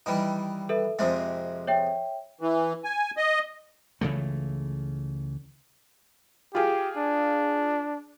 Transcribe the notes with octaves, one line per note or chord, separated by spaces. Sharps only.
D#3 E3 G3
A4 B4 E5
F2 C3 G#3 E5
C#5 E5 G5
E3
G#5
D#5
C#2 C#3 E3 A3
F4 G4 G#4
D4